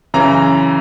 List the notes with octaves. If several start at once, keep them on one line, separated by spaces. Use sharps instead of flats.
F#2 C#3 E3 A#5